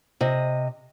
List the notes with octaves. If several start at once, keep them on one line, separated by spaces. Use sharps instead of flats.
C3 D#5